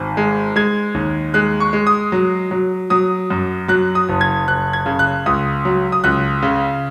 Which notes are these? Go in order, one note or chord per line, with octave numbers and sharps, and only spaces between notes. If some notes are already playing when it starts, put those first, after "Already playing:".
Already playing: G#1 G#5
G#3
G#3 G#6
D#2
G#3 F#6
C#6
G#3
D#6
F#3
F#3
F#3 D#6
F#2
F#3 F#6
D#6
F#1
G#6
F#1 F#6
G#6
C#3
F#6
C#2 D#6
F#3
D#6
C#2 F#6
C#3